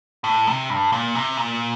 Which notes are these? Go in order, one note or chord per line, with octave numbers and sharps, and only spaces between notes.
A2
C3
G2
A#2
C3
A#2